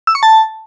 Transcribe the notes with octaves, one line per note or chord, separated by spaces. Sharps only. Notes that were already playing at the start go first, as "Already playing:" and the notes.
E6
C#6
A5